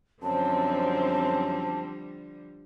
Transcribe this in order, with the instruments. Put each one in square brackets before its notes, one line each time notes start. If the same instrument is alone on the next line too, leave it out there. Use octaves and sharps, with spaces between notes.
[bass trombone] F#2 [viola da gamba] D3 F3 G3 [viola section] C4 [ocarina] A5